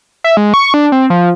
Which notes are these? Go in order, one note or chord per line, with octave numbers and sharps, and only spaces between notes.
E5
G#3
C#6
D4
C4
F3